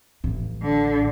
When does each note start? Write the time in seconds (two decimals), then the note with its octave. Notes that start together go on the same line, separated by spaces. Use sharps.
0.24 A1 A2
0.62 D3